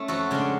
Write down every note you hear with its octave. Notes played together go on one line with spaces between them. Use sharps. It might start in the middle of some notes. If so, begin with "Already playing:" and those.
Already playing: A3 C#4
F2 F#4 A4
C#3 G#3 D4